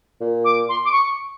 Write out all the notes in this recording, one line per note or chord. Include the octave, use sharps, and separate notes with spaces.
A#2
D6
C6
D6
C#6